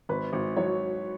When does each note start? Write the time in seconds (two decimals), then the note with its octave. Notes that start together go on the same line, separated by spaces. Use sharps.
0.09 G#1 B4
0.33 G#1
0.57 F#3 C#5